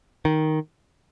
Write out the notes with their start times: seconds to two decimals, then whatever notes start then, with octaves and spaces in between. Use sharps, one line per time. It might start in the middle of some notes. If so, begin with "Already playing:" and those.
0.25 D#3